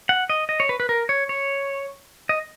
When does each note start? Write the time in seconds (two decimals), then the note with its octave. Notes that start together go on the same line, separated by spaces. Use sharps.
0.09 F#5
0.30 D#5
0.49 D#5
0.60 C#5
0.69 B4
0.80 B4
0.89 A#4
1.09 C#5
1.29 C#5
2.29 D#5